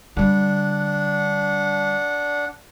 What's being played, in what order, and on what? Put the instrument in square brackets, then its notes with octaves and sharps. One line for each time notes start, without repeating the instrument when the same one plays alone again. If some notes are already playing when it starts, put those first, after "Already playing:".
[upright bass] D3 G3 [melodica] D4 F#5